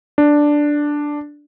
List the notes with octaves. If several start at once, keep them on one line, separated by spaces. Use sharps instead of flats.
D4